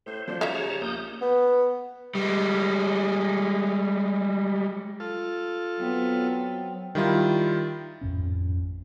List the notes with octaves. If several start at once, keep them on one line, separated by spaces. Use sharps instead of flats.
A2 C5
F#2 F3 D5
C#3 F#4 C#5 E5 F5 A5 A#5
G3
A#1 A#3 D#6 G6
B3
G3 G#3
F4 A4
F#3 B3 C4
D#3 G3 E4 F4
G#1 F2 A2 C#4